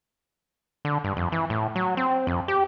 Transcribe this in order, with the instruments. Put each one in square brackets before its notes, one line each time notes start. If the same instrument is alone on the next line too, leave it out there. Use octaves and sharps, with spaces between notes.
[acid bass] D3
G2
F2
E3
A2
F#3
C4
F2
G4